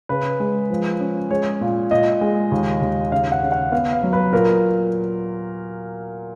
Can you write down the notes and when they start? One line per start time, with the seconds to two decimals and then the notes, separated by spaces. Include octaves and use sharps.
0.09 C#3 B4
0.40 G#3
0.70 F3
1.00 C#4
1.30 G#3 C#5
1.61 A#2
1.91 A#2 D#5
2.21 G#3
2.51 D#2
2.81 D#2
3.12 C#3 F5
3.32 F#5
3.42 C#3
3.52 F#5
3.72 B3 F5
3.93 F5
4.03 F#3
4.13 B4
4.33 A#2 A#4